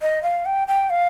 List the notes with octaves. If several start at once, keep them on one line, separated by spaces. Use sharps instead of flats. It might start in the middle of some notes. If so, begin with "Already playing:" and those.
D#5
F5
G5
G5
F5